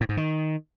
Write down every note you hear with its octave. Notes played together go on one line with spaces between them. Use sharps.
A2
G#2
D#3